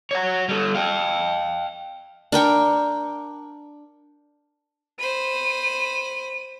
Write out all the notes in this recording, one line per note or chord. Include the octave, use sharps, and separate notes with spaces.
C#5 F#5
G3 A4
F5 G5
D4 A#4 G5 C#6
C5 B5 D#7